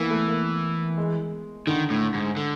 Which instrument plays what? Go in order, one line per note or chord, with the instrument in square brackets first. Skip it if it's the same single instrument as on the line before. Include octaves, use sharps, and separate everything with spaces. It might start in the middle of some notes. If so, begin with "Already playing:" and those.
Already playing: [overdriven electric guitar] E3 [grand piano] A#3 B3
[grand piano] A3
A#3
G#3
[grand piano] D3 [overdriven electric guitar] D#3
[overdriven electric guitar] A2
G#2
D3